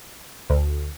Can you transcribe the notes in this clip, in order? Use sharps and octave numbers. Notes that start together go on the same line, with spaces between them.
D2